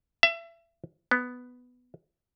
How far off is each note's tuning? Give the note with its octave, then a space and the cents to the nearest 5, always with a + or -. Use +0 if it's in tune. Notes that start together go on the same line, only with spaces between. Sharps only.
E5 +30
B3 +5